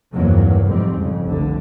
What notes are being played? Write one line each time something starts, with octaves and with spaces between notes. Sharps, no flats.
E2 G2 C3 D#3 F#3 A#3
B1 F2 G#2 C3 G3 C4
F2 C#3
F1 C2 D3